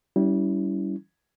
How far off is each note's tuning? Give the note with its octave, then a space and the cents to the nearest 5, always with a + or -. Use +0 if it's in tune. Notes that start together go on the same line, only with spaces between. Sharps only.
G3 -20 C#4 +30 E4 -10